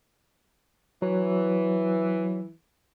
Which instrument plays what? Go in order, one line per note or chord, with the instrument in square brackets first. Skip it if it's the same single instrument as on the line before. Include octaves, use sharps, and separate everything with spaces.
[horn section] E3 [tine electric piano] F#3